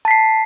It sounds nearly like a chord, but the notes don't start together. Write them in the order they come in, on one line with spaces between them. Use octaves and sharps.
A5 B6 C7